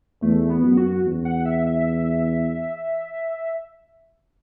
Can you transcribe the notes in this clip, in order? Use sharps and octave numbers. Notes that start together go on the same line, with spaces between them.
E2 A3
B3
F#2
F#4
E2
F#5
E5
E5